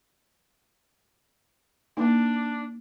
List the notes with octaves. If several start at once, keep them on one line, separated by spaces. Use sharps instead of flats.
A#3 D4 D#4